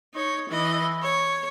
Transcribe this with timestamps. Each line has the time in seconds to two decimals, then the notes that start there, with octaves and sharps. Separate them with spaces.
0.14 D#4 C#5
0.50 E3 D#5
1.02 C#5